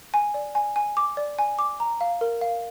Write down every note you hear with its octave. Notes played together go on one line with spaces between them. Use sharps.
G#5
D5
G#5
G#5
D6
D5
G#5
D6
A#5
F5
A#4
F5